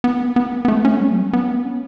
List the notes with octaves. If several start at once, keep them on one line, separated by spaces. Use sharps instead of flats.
B3
B3
B3
A3
B3
C#4
A3
G3
F#3
B3
C#4